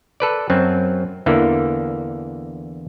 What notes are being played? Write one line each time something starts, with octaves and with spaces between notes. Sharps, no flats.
A4 B4 D5
F#2 F#3 C4
E2 D3 E3 A#3